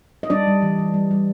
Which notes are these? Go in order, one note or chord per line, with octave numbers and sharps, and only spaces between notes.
D#5
G3 D4 D5
G3
E3
E3
G3
G3